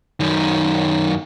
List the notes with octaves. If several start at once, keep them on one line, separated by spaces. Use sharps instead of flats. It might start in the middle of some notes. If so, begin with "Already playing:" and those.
F#2 D#3